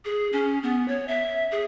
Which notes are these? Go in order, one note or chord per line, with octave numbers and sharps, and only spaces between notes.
G#4
C#4
B3
C#5
E5
G#4